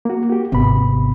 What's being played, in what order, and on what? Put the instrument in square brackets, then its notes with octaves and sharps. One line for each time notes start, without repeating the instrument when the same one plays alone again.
[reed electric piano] A#3 F#4
F#4 G4
[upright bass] G#1 [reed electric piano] C3 B3 B5